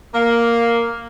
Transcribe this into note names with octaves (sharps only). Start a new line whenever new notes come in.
A#3